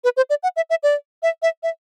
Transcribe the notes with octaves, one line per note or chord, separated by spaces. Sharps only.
B4
C5
D5
F#5
E5
E5
D5
E5
E5
E5